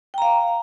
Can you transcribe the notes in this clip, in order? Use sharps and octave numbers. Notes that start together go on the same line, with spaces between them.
F5 G5 A#5